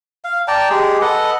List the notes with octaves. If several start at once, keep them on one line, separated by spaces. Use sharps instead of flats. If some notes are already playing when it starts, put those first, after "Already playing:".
F5
D5 G5 A5 A#5
G#3 G4 G#4
A4 B4 D#5 F#5